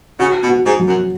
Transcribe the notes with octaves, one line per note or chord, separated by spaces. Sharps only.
C#3 F#4
B2
F#4
G#2
F#3
F#2